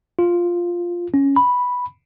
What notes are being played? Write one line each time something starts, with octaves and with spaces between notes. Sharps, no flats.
F4
C#4
B5